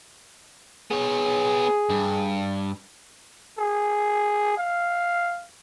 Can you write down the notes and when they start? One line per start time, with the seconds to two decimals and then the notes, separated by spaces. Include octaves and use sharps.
0.91 B3 G#4 C#5
1.89 G2
3.58 G#4
4.58 F5